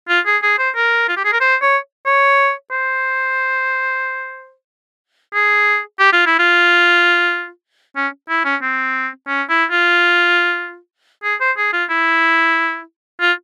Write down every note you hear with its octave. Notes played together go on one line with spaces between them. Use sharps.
F4
G#4
G#4
C5
A#4
F4
G4
G#4
A#4
C5
C#5
C#5
C5
G#4
G4
F4
E4
F4
C#4
E4
C#4
C4
C#4
E4
F4
G#4
C5
G#4
F4
E4
F4